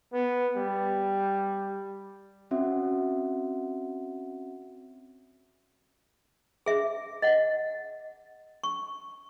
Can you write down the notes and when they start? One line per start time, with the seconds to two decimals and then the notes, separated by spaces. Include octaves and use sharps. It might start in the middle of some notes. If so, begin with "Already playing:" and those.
0.13 B3
0.56 G3
2.51 C4 C#4 F#4 E5 F#5
6.66 G#4 E5
7.22 D#5 F#5
8.64 C#6